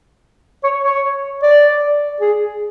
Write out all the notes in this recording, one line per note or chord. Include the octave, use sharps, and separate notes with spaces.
C#5
C#5
D5
G#4